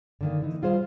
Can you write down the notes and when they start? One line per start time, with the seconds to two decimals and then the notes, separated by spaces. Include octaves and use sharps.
0.21 D3 D#3 A#3
0.42 E3 D#4
0.62 G3 F4 G#4 C5 F5